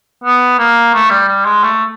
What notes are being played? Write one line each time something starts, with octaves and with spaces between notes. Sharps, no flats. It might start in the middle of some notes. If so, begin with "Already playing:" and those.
B3
A#3
A3
G3
G3
G#3
A3